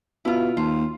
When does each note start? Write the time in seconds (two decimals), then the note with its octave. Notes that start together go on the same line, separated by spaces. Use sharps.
0.25 B2 E4 F4
0.57 D#2 F4